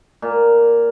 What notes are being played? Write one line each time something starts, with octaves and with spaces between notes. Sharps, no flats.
A#2